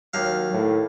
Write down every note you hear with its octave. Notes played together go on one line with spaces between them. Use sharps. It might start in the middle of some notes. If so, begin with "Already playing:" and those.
D#2 F#3 F5
A2